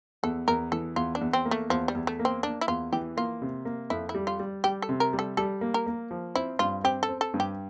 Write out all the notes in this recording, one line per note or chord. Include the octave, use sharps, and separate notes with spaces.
E2 A4
E2 A#4
E3 A4
E2 F4
D4
E2
C4
A#3
A3
E2 F3
G3
E2
A3
A#3
C4
A#3 D4
E4
E2 F4
E3 G4
A#3 F4
C3
A#3
F2 E4
E4
G3
F4
G3
G3 G4
A4
C3
A#4
G3
A4
G3 A4
A#3
A#4
A#3
F3
C4 E4
G2 F4
C4 G4
A4
C4
A4
G2
G4